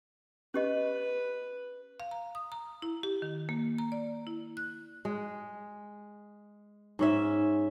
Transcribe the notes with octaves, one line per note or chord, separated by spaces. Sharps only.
C#4 G4 B4 D#5
F5
A#5
D#6
A#5
E4
G4
D#3
A#3
A#5
D5
E4
F#6
G#3
G#2 C#4 E5